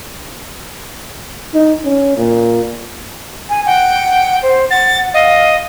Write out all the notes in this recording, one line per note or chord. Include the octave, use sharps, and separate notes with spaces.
D#4
C#4
A#2
G#5
F#5 G5
C5
F#5 A6
D#5 F5